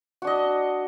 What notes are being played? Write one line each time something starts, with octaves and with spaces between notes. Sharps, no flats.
D4 F#4 D#5